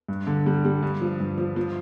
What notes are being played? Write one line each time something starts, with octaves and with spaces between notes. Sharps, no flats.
G2
D3
G3
G3
G2
F3
G2
F3
F3